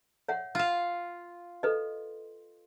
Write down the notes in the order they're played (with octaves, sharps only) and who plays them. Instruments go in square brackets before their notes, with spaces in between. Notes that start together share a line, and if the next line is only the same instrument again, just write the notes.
[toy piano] C#5 E5 F#5
[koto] F4 F5
[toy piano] A4 B4 D#5